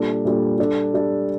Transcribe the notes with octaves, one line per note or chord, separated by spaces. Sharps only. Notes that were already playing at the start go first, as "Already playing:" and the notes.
Already playing: A#2 G3 D4 A4
A#2 G3 D4 A4
G3 D4 A4
G3 D4 A4